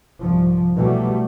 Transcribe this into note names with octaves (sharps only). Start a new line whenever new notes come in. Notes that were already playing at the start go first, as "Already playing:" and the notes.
C2 G#2 F3
B2 E3 F#3 G3 A3